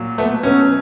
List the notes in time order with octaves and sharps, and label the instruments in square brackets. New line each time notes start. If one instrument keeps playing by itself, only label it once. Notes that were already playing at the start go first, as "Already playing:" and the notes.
Already playing: [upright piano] A#2 F#3
A3 B3
B2 F#3 B3 C#4